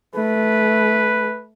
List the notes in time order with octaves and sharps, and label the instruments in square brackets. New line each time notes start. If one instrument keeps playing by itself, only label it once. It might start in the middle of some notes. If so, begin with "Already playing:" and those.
[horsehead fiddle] A3 [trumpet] B4